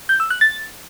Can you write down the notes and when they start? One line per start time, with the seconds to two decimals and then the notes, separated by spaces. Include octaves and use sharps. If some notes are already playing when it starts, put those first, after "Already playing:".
0.09 G6
0.20 E6
0.30 F#6
0.41 A6